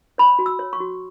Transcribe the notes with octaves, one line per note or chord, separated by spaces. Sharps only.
C#5 B5
F#4
E6
C#5
C#6
F#4